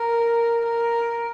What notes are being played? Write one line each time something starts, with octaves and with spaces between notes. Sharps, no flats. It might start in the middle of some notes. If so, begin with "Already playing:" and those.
Already playing: A#4
A#4